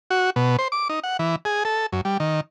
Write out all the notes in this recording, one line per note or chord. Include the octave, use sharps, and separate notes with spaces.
F#4
B2
C5
D6
D#4
F#5
E3
G#4
A4
F#2
G3
D#3